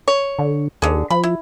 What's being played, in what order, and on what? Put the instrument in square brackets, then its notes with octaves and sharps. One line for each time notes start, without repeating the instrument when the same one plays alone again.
[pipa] C#5
[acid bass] D3
[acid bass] D#2 [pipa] D3 G#4
[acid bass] F3 [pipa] B5
[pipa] E4